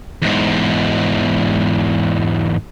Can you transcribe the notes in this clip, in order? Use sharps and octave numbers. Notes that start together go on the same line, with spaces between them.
E2 G#2